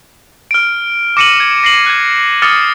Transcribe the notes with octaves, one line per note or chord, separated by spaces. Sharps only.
F6 D7
D6 A#6 C#7 D#7 E7 F#7
G#6
A#6 C7 F#7
F#6 G#6
D6 D#6 F6 A6 C#7